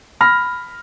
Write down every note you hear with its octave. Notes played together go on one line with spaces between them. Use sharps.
B5 F6 A#6